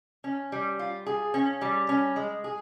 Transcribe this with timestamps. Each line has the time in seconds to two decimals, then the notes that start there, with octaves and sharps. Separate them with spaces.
0.24 C#4
0.52 G3
0.79 F4
1.06 G#4
1.34 C#4
1.61 G3
1.89 C#4
2.16 G#3
2.44 G#4